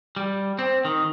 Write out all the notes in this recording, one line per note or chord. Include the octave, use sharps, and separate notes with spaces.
G3
C4
D#3